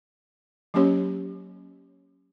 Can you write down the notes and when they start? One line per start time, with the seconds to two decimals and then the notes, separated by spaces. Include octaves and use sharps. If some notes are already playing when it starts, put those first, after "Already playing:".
0.74 F#3 A#3 C#4 G4 C#5